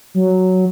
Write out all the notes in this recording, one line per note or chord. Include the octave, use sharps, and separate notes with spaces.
F#3